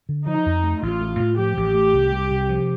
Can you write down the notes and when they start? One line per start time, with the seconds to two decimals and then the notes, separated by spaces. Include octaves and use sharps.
0.09 D3
0.26 F3 D#4
0.46 F2
0.63 A3
0.82 A1 F4
1.01 A3
1.19 A2
1.38 F3 G4
1.57 A1
1.74 A3
1.93 C2
2.12 C2
2.31 C3
2.49 F3